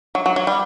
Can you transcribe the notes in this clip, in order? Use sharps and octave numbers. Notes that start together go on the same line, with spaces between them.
F#3
F#3
F#3
G3